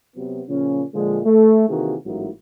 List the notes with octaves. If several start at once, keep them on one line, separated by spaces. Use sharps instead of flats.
C3 F#3 B3
A#2 C#3 F3 C#4
A#2 D3 F3 G#3
A3
C3 D#3 E3 A#3 F#4 G#4
A1 G#2 F#3 A#3 E4